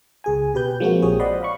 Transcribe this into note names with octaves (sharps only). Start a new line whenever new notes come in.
C#2 G#4 G#5
B2 G4 B4 G6
F3 G#3 A#3 C4 F4 F#4
A#1 G4 G#4 C#5 D#6
C5 D5 D#5 F#5 B5 C6
F5 B5 C#6